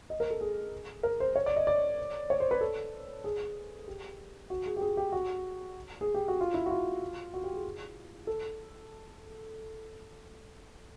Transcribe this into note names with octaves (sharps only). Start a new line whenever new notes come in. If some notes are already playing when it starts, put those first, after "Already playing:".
D#5
A#4
A4
G#4
A#4
C5
C#5
D5
D#5
D5
C#5
C5
B4
A4
G#4
G4
F#4
G#4
G4
G#4
G4
F#4
G#4
G4
F#4
F4
E4
F#4
F4
F#4
G4
G#4
A4